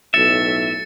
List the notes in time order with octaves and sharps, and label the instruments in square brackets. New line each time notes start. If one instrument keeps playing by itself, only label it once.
[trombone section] B1 A2 [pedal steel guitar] E5 [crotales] A6 C#7